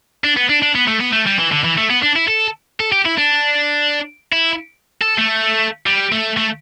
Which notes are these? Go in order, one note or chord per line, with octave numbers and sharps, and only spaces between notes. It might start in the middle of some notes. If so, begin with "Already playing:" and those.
D4
B3
D4
D4
B3
A3
B3
A3
G3
E3
D3
E3
A3
B3
D4
E4
A4
A4
G4
E4
D4
E4
A4
A3
G3
A3
A3